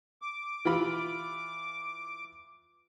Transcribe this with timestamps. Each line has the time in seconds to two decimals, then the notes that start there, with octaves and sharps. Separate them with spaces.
0.22 D6
0.65 E3 F4 B5